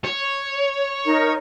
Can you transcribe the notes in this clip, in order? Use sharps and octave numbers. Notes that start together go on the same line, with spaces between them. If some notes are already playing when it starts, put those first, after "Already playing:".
C#5
D#4 A#4